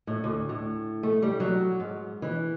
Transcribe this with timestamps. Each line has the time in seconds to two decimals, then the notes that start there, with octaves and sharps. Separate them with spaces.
0.07 A2
0.24 D2
0.49 A2
1.03 A3
1.22 G3
1.40 F#3
1.80 G#2
2.22 E3